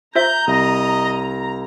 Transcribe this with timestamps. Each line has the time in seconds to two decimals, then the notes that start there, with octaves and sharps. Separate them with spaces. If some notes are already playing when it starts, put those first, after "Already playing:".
0.15 F4 C5 E5 A#5 G6
0.47 C2 D#5